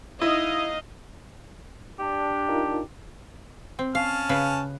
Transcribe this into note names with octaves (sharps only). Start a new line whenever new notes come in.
D#4 E4 D#5 F5
D4 G4
D#4 F4 A#4
C4
C#4 F5 A5 F6
C#3 B4